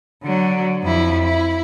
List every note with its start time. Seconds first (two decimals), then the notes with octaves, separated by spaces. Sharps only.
0.24 D3 F#3
0.83 F2 E4
1.24 E4